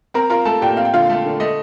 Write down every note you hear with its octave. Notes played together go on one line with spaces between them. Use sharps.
C4 A#4 A#5
F4 A#4 A#5
A3 A4 A5
A#2 G4 G5
C4 F5
G5
D3 F4 F5
A3
D3
A3 D#5